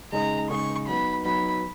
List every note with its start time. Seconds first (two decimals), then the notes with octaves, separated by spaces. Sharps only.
0.12 C#3 G#3 D#4 G#4 D#5 A#5
0.50 C#3 G#3 D#4 G#4 D#5 C#6
0.87 F#3 B3 D#4 B5
1.24 F#3 B3 D#4 B5